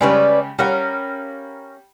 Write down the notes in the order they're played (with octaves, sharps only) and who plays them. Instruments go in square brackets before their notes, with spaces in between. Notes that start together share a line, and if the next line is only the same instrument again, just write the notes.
[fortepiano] C#3 G3 G#3 [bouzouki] C#4 B4 D5
[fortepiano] G3 F#5 [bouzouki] C#4 A#4 F5